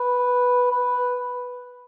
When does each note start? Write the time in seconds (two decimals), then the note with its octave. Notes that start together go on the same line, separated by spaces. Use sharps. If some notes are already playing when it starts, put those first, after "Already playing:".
Already playing: B4
0.72 B4